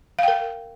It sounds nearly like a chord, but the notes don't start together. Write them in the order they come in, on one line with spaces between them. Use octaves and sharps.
F5 G5 A#4